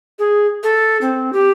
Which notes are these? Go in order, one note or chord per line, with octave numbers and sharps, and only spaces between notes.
G#4
A4
C4
G4